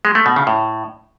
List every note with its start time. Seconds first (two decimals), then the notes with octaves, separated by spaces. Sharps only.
0.05 G#3
0.15 A3
0.26 B2
0.36 C#3
0.47 A2